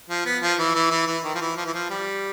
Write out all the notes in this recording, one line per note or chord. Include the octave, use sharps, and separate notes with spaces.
F3
B3
F3
E3
E3
E3
E3
D#3
F3
E3
F3
E3
F3
G3